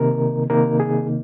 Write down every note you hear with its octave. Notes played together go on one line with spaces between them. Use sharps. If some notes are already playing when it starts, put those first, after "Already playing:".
Already playing: C3 D#3 A#3 D#4 A#4
C3 D#3 A#3 D#4 A#4
G#4